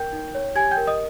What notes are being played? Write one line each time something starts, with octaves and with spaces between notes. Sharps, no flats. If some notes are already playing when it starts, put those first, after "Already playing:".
Already playing: A#4 G5 G6
D#4
C#5
G4 G#5 G#6
G5 G6
A#4
D#5 D#6